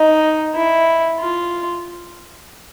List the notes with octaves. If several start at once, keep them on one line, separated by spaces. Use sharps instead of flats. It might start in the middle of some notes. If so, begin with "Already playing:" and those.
Already playing: D#4
E4
F4